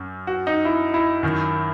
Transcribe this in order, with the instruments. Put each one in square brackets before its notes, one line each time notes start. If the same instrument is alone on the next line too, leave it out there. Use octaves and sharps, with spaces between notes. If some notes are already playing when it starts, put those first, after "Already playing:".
Already playing: [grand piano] F#2
F#4
D#4
E4
E4
F#2 D#3